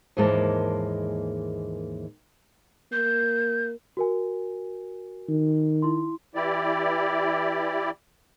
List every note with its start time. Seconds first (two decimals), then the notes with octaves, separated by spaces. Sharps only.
0.17 D#2 G#2 E3 G#3 A#3 A5
2.92 A#3 G6
3.97 F#4 A#4 G#5
5.29 D#3
5.82 E4 C6
6.35 E3 E4 G4 D5